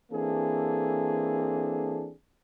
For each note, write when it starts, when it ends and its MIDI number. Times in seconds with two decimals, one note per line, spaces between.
0.12 2.12 52
0.12 2.12 58
0.12 2.12 60
0.12 2.12 62
0.12 2.12 68
0.12 2.12 69